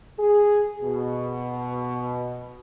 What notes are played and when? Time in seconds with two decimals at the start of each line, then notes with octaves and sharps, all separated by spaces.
0.19 G#4
0.83 B2